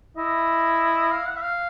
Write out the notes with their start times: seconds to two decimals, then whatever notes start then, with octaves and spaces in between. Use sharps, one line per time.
0.17 E4 D#5
1.11 F5
1.27 F#5
1.36 E5
1.42 F5